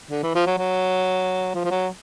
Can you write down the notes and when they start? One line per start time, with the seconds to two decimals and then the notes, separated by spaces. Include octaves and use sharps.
0.11 D3
0.23 E3
0.35 F3
0.47 F#3
0.58 F#3
1.55 F3
1.65 F3
1.71 F#3